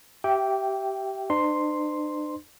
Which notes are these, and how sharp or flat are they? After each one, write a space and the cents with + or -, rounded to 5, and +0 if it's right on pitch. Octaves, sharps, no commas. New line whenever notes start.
G4 -20 E5 +10 G5 +0
D4 +45 C5 -40 C6 +0